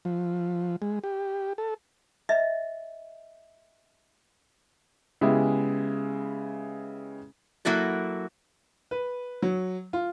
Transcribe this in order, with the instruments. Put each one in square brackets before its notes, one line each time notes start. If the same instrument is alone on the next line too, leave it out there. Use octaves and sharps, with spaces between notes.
[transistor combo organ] F3
G#3
G4
A4
[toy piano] D#5 E5
[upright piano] C#3 G#3 B3 E4 G4
[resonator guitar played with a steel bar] F#3 A#3 E4 F#4 A4
[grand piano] B4
F#3
F4